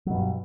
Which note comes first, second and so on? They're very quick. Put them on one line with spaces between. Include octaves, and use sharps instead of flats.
F#3 B2 G2